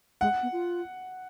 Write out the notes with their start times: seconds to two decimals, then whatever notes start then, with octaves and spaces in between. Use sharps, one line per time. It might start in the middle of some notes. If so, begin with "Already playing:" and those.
0.21 G#3 F#5
0.43 B3
0.52 F4